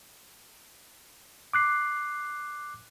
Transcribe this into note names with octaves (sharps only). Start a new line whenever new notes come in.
D6 F#6 C7